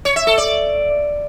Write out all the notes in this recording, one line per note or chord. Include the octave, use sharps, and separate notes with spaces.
C#5
E5
A4
D5